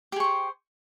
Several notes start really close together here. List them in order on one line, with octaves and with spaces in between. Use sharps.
G4 G#4 C#6 C5